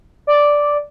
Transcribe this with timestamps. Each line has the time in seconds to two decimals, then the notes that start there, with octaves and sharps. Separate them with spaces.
0.27 D5